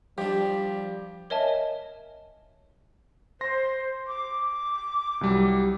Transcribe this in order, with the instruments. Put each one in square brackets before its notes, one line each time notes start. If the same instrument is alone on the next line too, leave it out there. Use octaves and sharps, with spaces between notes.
[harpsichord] F3 D4 [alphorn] G3 [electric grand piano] G4
[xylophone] A#4 C#5 D#5 E5 G#5 A5
[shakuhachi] C5 [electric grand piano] C6 A#6
[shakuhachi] D6
[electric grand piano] C2 F#3 G3